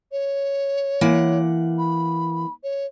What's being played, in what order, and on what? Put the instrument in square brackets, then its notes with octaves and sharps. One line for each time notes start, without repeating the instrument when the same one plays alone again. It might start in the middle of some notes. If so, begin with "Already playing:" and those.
[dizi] C#5
[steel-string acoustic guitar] E3 A#3 F#5
[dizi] B5
C#5